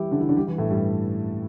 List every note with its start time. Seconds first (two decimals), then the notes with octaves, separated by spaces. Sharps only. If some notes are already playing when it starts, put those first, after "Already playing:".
Already playing: E3 G3 E4 G4
0.11 D3 D4
0.20 E3 E4
0.29 D3 D4
0.37 G3 G4
0.47 E3 E4
0.58 A2 A3
0.70 G2 G3